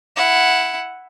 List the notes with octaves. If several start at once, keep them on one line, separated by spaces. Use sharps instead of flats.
E4 F#5